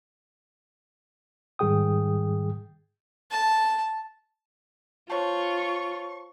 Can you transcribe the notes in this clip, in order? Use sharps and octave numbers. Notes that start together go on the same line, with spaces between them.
G#2 D#3 G3 G#4 G5 D#6
A5
F4 C5 C#5 A5 C#6